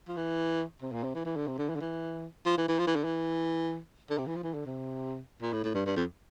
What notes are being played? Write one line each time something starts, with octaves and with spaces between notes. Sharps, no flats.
F3
E3
C3
A#2
C3
E3
E3
D3
C3
D3
E3
D3
E3
F3
E3
E3
F3
E3
D3
E3
D3
C3
E3
F3
E3
D3
C3
A#2
A2
A2
G2
G2
F2